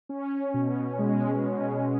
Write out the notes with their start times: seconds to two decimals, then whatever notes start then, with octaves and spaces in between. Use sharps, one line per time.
0.09 C#4
0.54 B2
0.99 G#3
1.43 B2